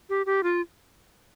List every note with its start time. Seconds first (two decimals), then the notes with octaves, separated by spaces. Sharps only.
0.10 G4
0.26 G4
0.43 F4